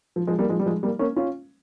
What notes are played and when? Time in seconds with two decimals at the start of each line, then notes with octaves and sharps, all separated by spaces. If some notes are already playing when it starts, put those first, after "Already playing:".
0.16 F3
0.27 F3 G#3
0.39 G3 A#3
0.49 F3 G#3
0.60 G3
0.66 F3 G#3
0.83 G3 A#3
0.99 A#3 C#4
1.16 C#4 F4